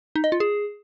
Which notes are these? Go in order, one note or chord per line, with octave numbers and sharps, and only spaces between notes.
D#4
D#5
F4
G#4